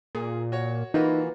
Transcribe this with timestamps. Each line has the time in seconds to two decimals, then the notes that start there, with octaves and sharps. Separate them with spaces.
0.15 A#2 G#4
0.52 F#4 C#5
0.94 E3 A#3 D#4 F4 F#4 B4